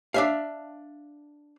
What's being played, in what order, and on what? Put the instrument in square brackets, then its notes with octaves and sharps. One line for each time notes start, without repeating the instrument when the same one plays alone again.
[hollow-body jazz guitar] D4 E5 F5